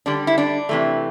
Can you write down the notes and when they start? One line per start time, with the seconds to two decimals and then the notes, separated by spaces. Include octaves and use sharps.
0.06 D3 G3 D4
0.27 E4
0.38 D4
0.69 C3 E3 A3